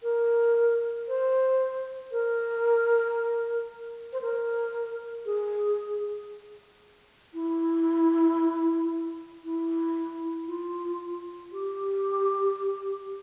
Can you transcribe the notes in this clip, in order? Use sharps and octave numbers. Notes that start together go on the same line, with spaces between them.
A#4
C5
A#4
C5
A#4
G#4
E4
E4
F4
G4